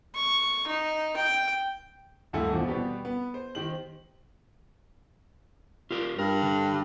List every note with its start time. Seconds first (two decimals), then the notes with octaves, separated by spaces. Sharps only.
0.15 C#6
0.67 D#4
1.16 G5
2.33 D2 G2 A#3 E4 A4 G#5
2.51 E2 B2 F3
2.68 B2 G3 B3 G4
3.05 B3
3.34 C5
3.55 D#3 G4 C5 F#7
5.91 F4 G4 A#4
6.19 G2 A#4
6.42 D3